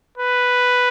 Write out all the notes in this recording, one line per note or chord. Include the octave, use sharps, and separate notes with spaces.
B4